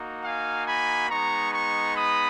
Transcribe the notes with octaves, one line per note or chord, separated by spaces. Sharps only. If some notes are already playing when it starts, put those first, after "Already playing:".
Already playing: A#3 D#4 F#4
F5 G#5
G#5 B5
G#3 B3 D#4 A#5 C#6
A#5 C#6
B5 D#6